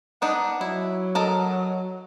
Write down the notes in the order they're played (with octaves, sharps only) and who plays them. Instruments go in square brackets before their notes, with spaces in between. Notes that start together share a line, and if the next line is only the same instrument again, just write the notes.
[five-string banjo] B3 D4 D#4 [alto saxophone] F#5
[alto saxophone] F#3 [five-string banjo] E4
[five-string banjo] A4 A#4 D#5